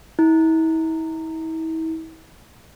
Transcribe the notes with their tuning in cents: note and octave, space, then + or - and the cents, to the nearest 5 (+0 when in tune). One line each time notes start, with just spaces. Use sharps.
E4 -40